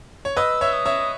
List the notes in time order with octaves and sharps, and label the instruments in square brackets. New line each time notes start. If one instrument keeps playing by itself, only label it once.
[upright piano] C#5
[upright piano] B4 D#5 [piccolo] E6
[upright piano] C#5 E5
[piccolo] D#6
[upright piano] C#5 E5